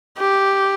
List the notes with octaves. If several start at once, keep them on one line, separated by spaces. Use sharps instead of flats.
G4